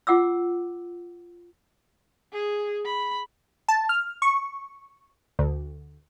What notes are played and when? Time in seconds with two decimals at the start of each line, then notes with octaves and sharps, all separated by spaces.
0.07 F4 F#5 D6 E6
2.33 G#4
2.86 B5
3.69 A5
3.89 F6
4.22 C#6
5.39 D2